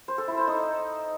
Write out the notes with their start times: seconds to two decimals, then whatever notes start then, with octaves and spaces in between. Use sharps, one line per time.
0.08 C5
0.18 A4
0.28 E4
0.38 C5
0.47 D#4